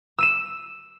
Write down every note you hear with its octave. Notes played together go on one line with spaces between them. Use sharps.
E6 D#7 E7